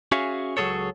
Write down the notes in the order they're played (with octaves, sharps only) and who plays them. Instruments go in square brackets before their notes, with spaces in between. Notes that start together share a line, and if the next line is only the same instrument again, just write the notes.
[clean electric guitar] C#4 F#4 G#4 C#5 E5 F5
C#2 F#3 G3 G#4 A4 C#5